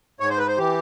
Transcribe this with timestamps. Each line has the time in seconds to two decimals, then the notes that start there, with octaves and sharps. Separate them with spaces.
0.20 G#2 C#5
0.30 C5
0.38 B4
0.48 C5
0.58 E3 G4